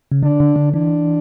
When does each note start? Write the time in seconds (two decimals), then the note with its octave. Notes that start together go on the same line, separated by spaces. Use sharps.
0.12 C#3
0.23 D3 D4
0.40 D3
0.56 D3
0.73 E3 D4